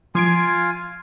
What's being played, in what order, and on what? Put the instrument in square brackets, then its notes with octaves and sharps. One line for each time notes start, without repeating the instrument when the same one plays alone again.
[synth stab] F3 G#6 D7 [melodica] F4 F5 G#5